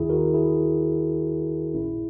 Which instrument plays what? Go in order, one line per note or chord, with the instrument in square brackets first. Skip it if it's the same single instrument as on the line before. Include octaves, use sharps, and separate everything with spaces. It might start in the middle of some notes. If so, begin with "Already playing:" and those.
Already playing: [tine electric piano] D#2 D#3 E4 G#4
F#4 A#4
E4 G#4
A#1 A#2 C#4 E4